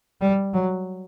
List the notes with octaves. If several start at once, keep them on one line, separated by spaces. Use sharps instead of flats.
G3
F#3